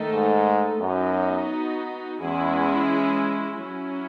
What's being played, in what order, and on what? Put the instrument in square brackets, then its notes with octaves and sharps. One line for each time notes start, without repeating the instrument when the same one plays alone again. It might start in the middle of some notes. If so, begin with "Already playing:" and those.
Already playing: [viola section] D#3 A3 D#4 A4
[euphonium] G#2
[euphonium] F#2 [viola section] B3 D#4 F#4
[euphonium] E2 [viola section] E3 G#3 C#4 E4 G#4
[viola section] F#3 C#4 E4